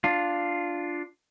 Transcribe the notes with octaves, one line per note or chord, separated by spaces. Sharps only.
D4 F4